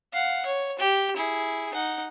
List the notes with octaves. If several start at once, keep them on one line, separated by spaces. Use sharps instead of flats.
F5 F#5
C#5
G4
E4 G#4
D#4 F#5